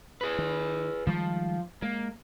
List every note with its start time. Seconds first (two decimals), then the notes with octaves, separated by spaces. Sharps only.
0.21 G#4 B4
0.39 D#3
1.07 D#3 F3 G3 G#3
1.82 G#3 A#3